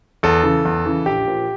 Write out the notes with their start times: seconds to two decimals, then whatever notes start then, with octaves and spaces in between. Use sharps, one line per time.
0.23 E2 A4
0.43 C#3 E3
0.65 E2
0.86 C#3 E3
1.06 A#1 G4
1.27 A#2 F3